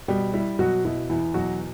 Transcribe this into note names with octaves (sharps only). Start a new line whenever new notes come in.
B2 G3 G4
G3 E4
B2 F#3 F#4
B2 E4
E2 E4
B2 F#3 F#4